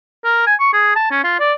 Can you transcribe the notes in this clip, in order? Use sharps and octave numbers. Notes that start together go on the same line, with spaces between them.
A#4
G#5
C#6
G#4
A5
C#4
F4
D5